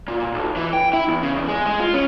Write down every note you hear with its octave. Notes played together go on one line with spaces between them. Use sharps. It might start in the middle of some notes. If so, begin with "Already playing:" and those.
A#2
B1
E3
G5
E4
E2
C#3
E2
G#3
G#3
F4
C#4